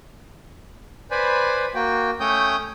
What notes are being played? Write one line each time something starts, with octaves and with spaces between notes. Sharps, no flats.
B4 C5 D5 G#5 B5
A#3 F#4 G5
A3 C#4 C#5 G5 D#6 G6